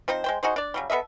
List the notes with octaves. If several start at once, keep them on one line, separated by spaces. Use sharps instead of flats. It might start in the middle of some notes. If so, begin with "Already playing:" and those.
F3 C4 D#4 C5
G#3 C5 G5
D#4 F#4 G#4 C5
D4 D5
C#3 F#3 G3
B3 A4 D#5 E5